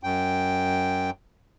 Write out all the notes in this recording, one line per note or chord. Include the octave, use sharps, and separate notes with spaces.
F#2 G5